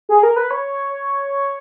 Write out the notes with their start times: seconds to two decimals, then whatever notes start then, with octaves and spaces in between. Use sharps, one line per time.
0.09 G#4
0.23 A#4
0.36 B4
0.51 C#5